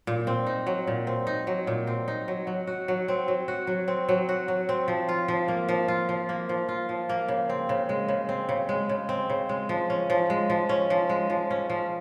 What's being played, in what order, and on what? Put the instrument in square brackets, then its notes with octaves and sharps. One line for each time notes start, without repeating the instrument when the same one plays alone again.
[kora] A#2
C4
D#4
F#3
A#2
C4
D#4
F#3
A#2
C4
D#4
F#3
F#3
F#4
F#3
C4
F#3
F#4
F#3
C4
F#3
F#4
F#3
C4
F3
F4
F3
A#3
F3
F4
F3
A#3
F3
F4
F3
A#3
C#3
C4
C#3
G#3
C#3
C4
C#3
G#3
C#3
C4
C#3
G#3
F3
C#4
F3
G#3
F3
C#4
F3
G#3
F3
C#4
F3